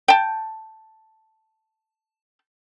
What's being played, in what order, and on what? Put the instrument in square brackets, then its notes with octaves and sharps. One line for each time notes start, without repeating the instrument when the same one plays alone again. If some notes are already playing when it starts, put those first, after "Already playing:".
[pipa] G5 A5